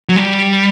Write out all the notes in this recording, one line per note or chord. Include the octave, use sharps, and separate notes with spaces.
F#3
G3